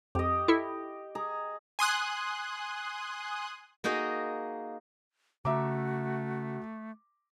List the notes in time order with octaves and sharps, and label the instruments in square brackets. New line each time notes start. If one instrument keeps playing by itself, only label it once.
[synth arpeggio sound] F2 [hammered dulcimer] G4 D#5
[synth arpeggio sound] E4 A4
[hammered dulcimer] G#4 A#5
[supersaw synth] G#5 C6 D#6 F#6
[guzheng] A#3 D#4 F#4 G#4 D#5
[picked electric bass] C#3 [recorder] A3 [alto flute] F#4 [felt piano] E5 A#5 D6